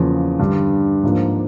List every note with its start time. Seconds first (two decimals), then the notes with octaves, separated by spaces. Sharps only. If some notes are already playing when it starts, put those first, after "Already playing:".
Already playing: E2 C#3 F3 A#3
0.39 G2 D3 G3
1.03 G#2 F3 A#3 D4